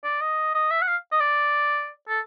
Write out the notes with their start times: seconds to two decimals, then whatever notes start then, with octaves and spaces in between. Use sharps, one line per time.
0.04 D5
0.21 D#5
0.55 D#5
0.71 E5
0.82 F#5
0.87 F5
1.12 D#5
1.20 D5
2.08 A4